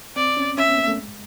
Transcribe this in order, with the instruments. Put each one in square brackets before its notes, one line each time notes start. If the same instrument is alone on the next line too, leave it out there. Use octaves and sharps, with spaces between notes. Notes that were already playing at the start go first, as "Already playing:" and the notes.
[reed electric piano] C4 [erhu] D5
[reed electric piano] C#4
[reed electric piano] C#4 [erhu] E5
[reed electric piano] B3
A#3
A3
G#3